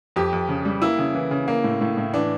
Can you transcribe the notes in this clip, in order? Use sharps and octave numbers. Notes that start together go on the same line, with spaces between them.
F2 G4
F2
C#3
G3
A#3 E4
C#3
E3
C#3
A#3
A2
A2
A2
E3 D4